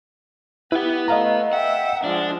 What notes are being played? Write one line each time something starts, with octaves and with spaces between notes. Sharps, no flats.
E4 G4 B4 F#5
A3 D#5 F5 A#5
E5 F#5 G5
F3 G#3 D4